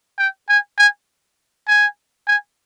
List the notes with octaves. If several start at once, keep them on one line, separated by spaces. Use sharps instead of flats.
G5
G#5
G#5
G#5
G#5